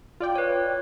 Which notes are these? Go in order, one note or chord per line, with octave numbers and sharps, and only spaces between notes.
F4 D5 G5
B4 C#5